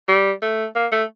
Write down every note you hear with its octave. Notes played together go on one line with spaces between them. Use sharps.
G3
A3
A#3
A3